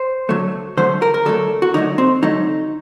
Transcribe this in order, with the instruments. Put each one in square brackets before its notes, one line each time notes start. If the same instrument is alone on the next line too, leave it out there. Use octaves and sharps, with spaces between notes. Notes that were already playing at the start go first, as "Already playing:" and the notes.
Already playing: [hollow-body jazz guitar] C5
D3 F#3 A3
D3 F#3 A3 C5
A#4
A#4
D3 F#3 A3 A4
F#4
D3 F#3 A3 D#4
C4
D3 F#3 A3 D#4